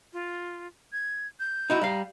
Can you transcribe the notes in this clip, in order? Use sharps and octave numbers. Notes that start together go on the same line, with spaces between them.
F4
G#6
G6
D#4 E4 F#4
G3 F5 A#5